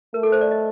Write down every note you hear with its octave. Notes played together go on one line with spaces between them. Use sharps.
A3 A#4
A4
C5
D5
D#5